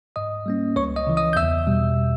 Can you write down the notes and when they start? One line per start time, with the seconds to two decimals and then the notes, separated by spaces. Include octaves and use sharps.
0.16 G#2 D#5 D#6
0.46 G3 A#3 C#4
0.76 C#2 C#5 C#6
0.96 D#5 D#6
1.07 C#3 E3
1.17 D#5 D#6
1.33 G6
1.36 E2 E5 E6
1.67 B2 G3